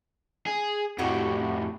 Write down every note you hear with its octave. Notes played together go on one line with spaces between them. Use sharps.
G#4
F2 A2 E4 F#4 G4